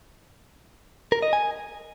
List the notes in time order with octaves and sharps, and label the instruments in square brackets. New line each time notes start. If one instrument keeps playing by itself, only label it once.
[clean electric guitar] A#4
D#5
G#5